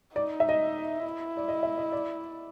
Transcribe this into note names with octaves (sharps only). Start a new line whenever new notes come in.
D#4 D5
E5
D#5
E4
D5
D#5
E5
D#5
D5